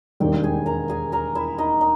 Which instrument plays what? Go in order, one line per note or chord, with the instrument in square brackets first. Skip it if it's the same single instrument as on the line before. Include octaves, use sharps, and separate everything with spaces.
[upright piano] E1 D#2 D#3 G3 [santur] G4 G5
[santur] G5
G#4 G#5
A#4 A#5
G#4 G#5
A#4 A#5
E4 E5
D#4 D#5
D#4